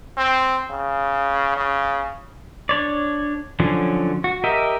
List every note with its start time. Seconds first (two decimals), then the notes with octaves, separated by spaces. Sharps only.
0.17 C4
0.70 C#3
1.57 C#3
2.69 D4 C#5 D5
3.60 D3 F3 F#3 C#4
4.24 F#4
4.44 G4 A#4 D#5 E5